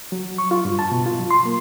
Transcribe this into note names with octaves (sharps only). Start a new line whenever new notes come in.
F#3
C#6
F4
G2
A5
B2
F4
F#3
C6
A#3